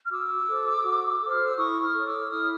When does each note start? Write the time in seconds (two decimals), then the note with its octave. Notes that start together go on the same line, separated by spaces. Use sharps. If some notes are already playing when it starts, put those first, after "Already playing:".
0.05 F6
0.11 F#4 D6 E6
0.48 A4 C5
0.84 F#4
1.21 A4 C5
1.30 F6
1.44 E6
1.57 E4 C#6 D#6
1.81 D#6 F6
1.93 A4 C#5
2.06 D6 E6
2.30 E4 D#6 F6